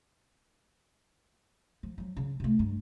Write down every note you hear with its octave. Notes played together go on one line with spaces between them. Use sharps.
F3
F3 F#3
C#3
C3 A3
G2